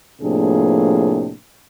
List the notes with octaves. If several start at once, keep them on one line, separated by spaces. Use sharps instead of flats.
A2 C3 F3 A#3 D4 G#4